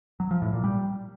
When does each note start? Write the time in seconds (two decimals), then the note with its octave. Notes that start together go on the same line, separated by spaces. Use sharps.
0.20 F#3
0.31 F3
0.42 A2
0.53 A#2
0.64 G3